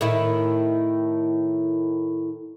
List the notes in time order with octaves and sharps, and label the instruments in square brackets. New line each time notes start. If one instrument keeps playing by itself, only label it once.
[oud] A2 D#3 E4